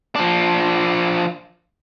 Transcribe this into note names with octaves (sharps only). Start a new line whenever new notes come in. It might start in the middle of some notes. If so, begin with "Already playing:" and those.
F3 D4